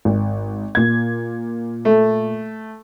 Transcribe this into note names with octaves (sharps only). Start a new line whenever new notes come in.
G#1
A#2 G#6
A3